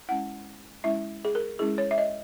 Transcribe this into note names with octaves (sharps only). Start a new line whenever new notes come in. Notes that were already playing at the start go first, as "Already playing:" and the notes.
G#3 C#4 E4 F#5
G#3 C#4 E4 E5
G#4
A#4
G#3 C#4 E4 G#4
C#5
E5
D#5